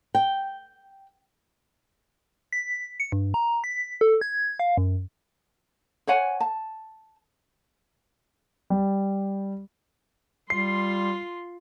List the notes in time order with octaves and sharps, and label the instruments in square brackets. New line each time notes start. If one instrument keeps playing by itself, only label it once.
[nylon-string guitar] G5
[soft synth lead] B6
C#7
G2
A#5
B6
A4
G#6
F5
F#2
[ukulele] C5 C#5 F#5 G#5
A5
[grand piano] G3
[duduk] G3 [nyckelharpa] F4 C6 [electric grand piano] C7